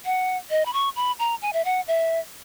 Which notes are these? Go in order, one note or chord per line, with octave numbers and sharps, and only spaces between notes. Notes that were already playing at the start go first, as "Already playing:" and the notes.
F#5
D#5
B5
C#6
B5
A#5
G#5
E5
F#5
E5